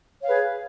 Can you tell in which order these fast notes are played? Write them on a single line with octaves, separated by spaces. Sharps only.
C#5 F5 B4 G#4